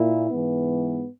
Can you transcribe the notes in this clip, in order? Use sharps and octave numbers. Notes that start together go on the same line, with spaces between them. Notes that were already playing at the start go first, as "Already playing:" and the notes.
Already playing: A#2 E4
G#2 E3 B3